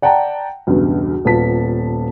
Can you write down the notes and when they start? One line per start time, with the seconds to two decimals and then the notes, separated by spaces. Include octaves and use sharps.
0.02 D5 F#5 G5 A5 A#5
0.67 B1 E2 G2 C#3
1.25 D#1 B3 F4 A5 B6